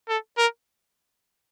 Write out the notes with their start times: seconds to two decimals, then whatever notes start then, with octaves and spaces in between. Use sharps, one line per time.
0.09 A4
0.38 A#4